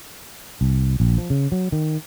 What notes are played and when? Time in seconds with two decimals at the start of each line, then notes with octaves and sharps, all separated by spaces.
0.61 C2
1.00 A#1
1.18 F3
1.30 C#3
1.52 F#3
1.72 D#3